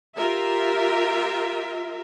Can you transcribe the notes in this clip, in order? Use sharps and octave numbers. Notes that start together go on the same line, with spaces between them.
F4 G4 A#4 E5